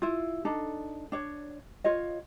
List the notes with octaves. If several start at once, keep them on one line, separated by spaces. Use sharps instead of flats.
E4 F4
D4 D#4 A4
D4 C#5
F4 C#5 D#5